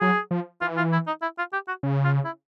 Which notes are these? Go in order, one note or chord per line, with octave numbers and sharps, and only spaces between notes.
F#3 G#4
F3
E3 F4
F4
E4
D#4
E4
F4
G4
F#4
C#3
F4
E4